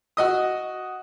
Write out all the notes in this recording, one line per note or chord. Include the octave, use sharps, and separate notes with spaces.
F#4 D#5 D#6